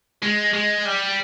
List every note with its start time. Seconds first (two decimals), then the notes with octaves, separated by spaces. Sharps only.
0.22 G#3
0.54 G#3
0.85 G3